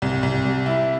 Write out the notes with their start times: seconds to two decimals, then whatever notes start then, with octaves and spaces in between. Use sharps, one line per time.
0.02 C2
0.23 C2
0.45 G3
0.66 E4